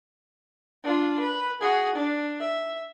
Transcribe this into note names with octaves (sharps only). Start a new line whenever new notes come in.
D4 F4
B4
F#4 G#4
D4
E5